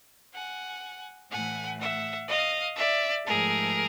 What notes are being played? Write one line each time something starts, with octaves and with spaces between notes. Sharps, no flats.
F#5 G#5
A2 E3 A3 F#5 G#5
E5 F#5
D#5 F5
D5 E5
G#2 F3 A3 G#4 A#4